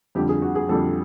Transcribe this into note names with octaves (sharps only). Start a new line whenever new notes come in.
F2 D3 G3 G4
G#4
F#4
G#4
F2 D3 G3 A4